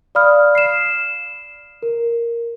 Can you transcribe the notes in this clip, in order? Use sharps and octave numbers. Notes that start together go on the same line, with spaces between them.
D5 F5 B5 D#6 F6
C7 E7
A#4